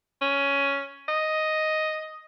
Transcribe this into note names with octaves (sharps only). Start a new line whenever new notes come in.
C#4
D#5